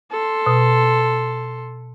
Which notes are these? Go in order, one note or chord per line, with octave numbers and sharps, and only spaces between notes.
A4 C6
B2